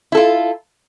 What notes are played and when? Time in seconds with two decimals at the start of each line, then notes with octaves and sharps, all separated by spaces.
0.12 E4
0.15 A4
0.17 F4